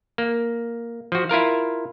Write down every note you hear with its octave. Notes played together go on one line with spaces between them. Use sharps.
A#3
F3 F#4
E4 F4 A#4 F5